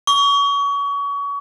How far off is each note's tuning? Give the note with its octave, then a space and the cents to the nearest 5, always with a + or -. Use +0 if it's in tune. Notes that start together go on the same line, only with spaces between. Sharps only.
C#6 +30